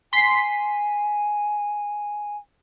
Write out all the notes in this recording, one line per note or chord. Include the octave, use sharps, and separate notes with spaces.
G#5 C6 B6 C7